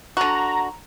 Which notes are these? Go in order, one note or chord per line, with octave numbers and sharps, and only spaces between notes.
D3 F#4 A#5